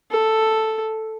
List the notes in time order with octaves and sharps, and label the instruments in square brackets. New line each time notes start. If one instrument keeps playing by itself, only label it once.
[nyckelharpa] A4